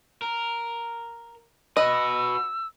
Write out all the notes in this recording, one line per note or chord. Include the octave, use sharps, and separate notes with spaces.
A#4
F#4 B4 D#5 E6